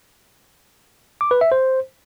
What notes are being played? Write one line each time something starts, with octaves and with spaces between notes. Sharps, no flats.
D6
B4
E5
C5